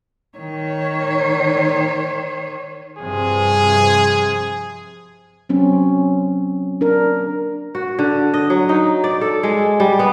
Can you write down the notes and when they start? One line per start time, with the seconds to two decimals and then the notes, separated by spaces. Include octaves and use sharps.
0.38 D#3 C#5
2.97 G2 C3 F3 G#4
5.49 F#3 C4 C#4
6.81 D4 A#4
7.75 F#4
7.99 D3
8.34 D#5
8.50 F#3
8.69 D#4
9.04 D5
9.21 A4
9.43 G#3
9.80 G3
9.99 B3